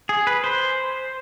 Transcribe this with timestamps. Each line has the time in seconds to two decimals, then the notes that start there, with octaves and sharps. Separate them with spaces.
0.09 G#4
0.27 B4
0.44 C5